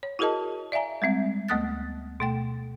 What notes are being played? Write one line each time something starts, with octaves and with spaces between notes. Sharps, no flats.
C#5
E4 F#4 G#4 A#4 D#5 A5
D5 E5 F5 G#5 A#5
G3 G#3 C4 E5
D2 A3 B3 D#6 F#6 A6
B2 A3 G5